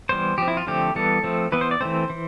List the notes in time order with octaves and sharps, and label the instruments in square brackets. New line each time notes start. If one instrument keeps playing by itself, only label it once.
[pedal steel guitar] E3 G3 B3 C5
F3 C4 G4
E4
F4
D3 F3 A3 C4 G4
E3 G3 B3 A4
F3 A3 C4
E3 B3 B4
C5
D5
E3 A3 C4 C5
E3